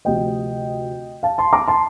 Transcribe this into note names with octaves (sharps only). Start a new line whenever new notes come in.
D2 C3 F3 D#5 G5
F5 A5
A5 C6
A#5 D6
A5 C6